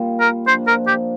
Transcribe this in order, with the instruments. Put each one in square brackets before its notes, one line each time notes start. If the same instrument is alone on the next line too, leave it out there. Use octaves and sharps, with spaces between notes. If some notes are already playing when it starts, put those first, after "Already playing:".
Already playing: [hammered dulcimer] A#2 G3 A#3 F4
[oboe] A#4
[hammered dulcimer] F3 A#3 D4 [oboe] C5
[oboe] A#4
G4